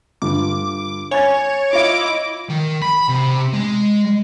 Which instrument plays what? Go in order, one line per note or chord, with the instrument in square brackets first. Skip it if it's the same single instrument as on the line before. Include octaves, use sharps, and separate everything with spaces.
[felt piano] G2 D3 F4 [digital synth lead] D6
[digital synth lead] C#5 [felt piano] G#5 G#6 A6
[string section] E4 D#5 D6 [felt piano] F4 F5
[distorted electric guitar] D#3
B5
C3
G#3